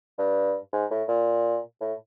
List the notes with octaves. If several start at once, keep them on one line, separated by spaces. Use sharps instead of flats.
G2
G#2
A2
A#2
A2